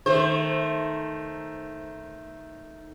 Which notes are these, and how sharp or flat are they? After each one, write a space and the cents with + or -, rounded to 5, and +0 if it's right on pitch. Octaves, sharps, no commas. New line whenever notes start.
D#3 +0 A3 +0 C5 +15